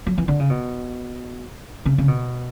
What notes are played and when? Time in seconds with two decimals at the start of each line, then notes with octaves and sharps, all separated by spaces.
0.07 F#3
0.18 E3
0.28 D3
0.40 C#3
0.50 B2
1.86 C#3
1.98 C#3
2.08 B2